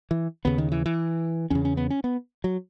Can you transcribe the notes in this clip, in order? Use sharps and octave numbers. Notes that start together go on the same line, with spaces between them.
E3
D#2 C#3 B3
D#3
E3
E3
E2 C#3 C#4
C#4
B3
C#4
B3
F#3